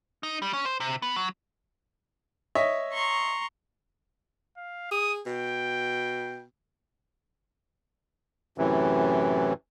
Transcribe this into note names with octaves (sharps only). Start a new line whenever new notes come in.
D#4
G3
C#4
C5
C3
B3
F#3
C#5 D#5 E5
A#5 C6 C#6
F5
G#4 D#6
B2 G5
F#2 A2 C3 E3